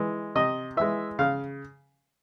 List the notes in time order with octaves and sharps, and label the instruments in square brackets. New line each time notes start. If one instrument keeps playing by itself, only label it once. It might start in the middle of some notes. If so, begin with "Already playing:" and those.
Already playing: [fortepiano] E3 G#3
C3 D#5
E3 G#3 E5
C#3 F5